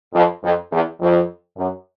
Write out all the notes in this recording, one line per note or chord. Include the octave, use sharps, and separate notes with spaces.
F2
F2
E2
F2
F#2